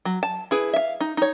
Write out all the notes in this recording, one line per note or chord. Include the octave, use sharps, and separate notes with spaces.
F#3
A5
E4 G#4 B4
E5 F5
D#4
D#4 C#5